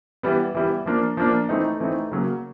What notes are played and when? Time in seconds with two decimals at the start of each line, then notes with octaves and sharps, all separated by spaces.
0.23 E3 G3 B3
0.55 E3 G3 B3
0.86 F3 A#3 D4
1.17 F3 A#3 D4
1.49 E3 A3 C4 D#4
1.80 E3 A3 C4 D#4
2.12 C#3 F#3 A#3